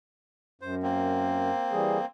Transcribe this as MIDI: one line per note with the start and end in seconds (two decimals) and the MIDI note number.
0.61 1.51 42
0.61 0.75 72
0.83 2.06 58
0.83 2.06 60
1.72 1.98 52
1.72 1.98 55
1.72 1.98 68